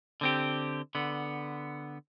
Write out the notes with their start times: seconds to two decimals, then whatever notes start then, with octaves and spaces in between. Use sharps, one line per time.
0.21 D3 C4 G4
0.95 D3 B3